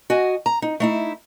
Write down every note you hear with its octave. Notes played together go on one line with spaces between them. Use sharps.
F#4 D#5 G#5
A#5
D#4
A3 D#4 E4